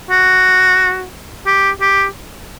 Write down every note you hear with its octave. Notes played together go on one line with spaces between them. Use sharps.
F#4
G4
G4